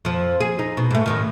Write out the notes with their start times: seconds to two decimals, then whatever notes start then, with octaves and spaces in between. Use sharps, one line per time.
0.05 F2 F3
0.40 G#4
0.59 D#4
0.77 B2
0.91 G#2 A3
1.06 F#2 A2 D#3